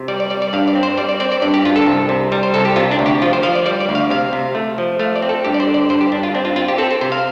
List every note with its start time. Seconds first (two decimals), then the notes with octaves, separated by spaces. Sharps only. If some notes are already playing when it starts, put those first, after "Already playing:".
Already playing: C3
0.08 G3 D5
0.20 D5
0.30 G3 D5
0.42 D5
0.53 G2 F5
0.68 D5
0.75 C4
0.83 C5
0.98 G3 D5
1.09 D5
1.20 C4 D5
1.32 D5
1.42 G2 D5
1.54 G4
1.65 G2 F4
1.76 A4
1.87 C2
2.09 C3
2.32 G3
2.43 C5
2.54 C2 A4
2.65 G4
2.76 C3 F4
2.91 D4
2.99 D2
3.06 G4
3.22 F3 F4
3.33 C5
3.43 F3 F5
3.55 D5
3.66 G3 D5
3.80 D5
3.89 D2
3.95 F5
4.10 C3 F5
4.33 C3
4.55 A3
4.78 F3
4.99 A3 F5
5.16 D5
5.22 C4
5.29 A4
5.45 G2 G4
5.54 D5
5.60 C5
5.68 D3
5.74 D5
5.89 G2 C5
6.01 G4
6.12 G2 D4
6.23 F4
6.34 C4 D4
6.45 F4
6.56 C4 F4
6.68 G4
6.78 C4 A4
6.91 C5
7.01 C3 C5
7.12 F5